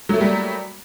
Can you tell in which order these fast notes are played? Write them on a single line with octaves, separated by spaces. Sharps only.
F#3 A3 A#3 G3